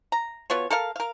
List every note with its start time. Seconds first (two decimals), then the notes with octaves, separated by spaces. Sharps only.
0.12 A#5
0.50 B2 B3 F4 C#5
0.70 A4 A#4 F5
0.96 A#4 F5